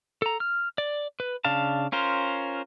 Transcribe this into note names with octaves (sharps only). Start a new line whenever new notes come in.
A4 A#5
F6
D5
B4
C#3 D4 F5 A5
C#4 F4 A#4 C5